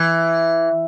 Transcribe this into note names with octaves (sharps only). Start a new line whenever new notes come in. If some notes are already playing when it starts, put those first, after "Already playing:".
Already playing: E3